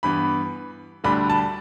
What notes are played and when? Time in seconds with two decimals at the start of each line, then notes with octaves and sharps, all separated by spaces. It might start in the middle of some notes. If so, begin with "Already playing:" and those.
0.03 G2 E3 B3 B5
1.04 D2 D3 G3 D4 B5
1.30 A5